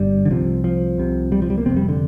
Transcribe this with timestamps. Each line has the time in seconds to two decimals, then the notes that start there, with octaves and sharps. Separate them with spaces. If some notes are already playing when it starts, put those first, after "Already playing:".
Already playing: G1 G2 G3
0.25 D3
0.31 C2 C3 F3
0.64 F3
0.98 C2 C3
1.32 G3
1.42 F3
1.50 G3
1.58 A#3
1.65 F1 F2 C3 C4
1.77 G3
1.89 D3